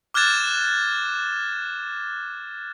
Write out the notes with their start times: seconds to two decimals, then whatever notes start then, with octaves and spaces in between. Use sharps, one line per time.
0.14 D6 F6 F#6 G#6 A6 E7